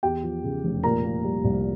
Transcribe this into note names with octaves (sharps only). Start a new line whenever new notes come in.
E2 G4 G5
F3
C#3
F1
A#2 A#4 A#5
A#3
G3
C2